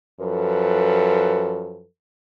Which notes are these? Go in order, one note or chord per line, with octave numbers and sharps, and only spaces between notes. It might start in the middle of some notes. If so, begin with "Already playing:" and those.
F#2 F3 A4 B4